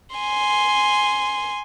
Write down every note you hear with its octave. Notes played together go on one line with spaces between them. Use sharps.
G#5 C6